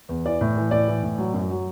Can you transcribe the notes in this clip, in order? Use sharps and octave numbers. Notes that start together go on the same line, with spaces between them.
E2
E3 D5
A2
E3
A2 D5
E3
A2
F#3
F#2
F#3